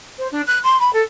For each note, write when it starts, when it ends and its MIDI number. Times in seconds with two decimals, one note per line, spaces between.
0.18 0.28 72
0.32 0.41 62
0.47 0.59 90
0.63 0.78 84
0.80 0.93 83
0.93 1.02 69